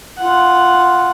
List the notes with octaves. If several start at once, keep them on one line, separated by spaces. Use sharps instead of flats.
F4 F#5